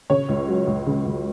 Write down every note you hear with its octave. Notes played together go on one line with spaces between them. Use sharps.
C#3 C#5
C#2
F#3
C#2
C#3
C#2